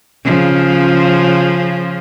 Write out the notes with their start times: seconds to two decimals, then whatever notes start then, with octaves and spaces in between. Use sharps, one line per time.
0.24 C#3 F3